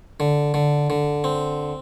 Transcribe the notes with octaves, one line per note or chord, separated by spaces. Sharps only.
D3
D3
D3
C4